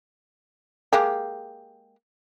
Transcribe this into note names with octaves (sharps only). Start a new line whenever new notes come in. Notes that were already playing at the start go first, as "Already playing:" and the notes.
G#3 A#3 G4